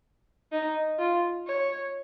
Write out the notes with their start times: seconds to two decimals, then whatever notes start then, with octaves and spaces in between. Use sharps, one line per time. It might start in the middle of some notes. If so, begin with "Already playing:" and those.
0.52 D#4
0.99 F4
1.47 C#5